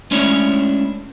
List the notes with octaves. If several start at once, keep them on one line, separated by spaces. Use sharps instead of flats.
G#3 A3 C#4 D4 E4 C#5